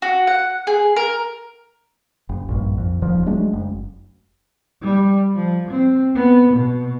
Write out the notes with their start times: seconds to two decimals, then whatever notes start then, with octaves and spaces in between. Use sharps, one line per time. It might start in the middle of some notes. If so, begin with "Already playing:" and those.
0.02 F#4
0.27 F#5
0.67 G#4
0.96 A#4
2.29 F#1
2.49 A#1 G2
2.78 F2
3.02 D#1 F3
3.26 F#3 G#3 A3 D4
3.53 F#1
4.82 G3
5.36 F3
5.71 C4
6.15 B3
6.53 B2